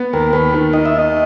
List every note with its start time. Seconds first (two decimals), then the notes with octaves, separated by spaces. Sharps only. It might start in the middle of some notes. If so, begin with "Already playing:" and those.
Already playing: B3
0.13 D#2 A#4
0.33 D#2 B4
0.54 D#3
0.73 D#3 D#5
0.85 E5
0.94 D#3 D#5